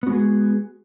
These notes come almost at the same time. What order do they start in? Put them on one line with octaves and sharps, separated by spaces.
B3 F#4 G#3 G#4